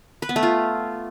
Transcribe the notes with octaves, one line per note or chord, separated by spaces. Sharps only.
B4
B3
A3
F4